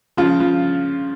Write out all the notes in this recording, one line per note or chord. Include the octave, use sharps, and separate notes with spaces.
C#3 F3 F4
F3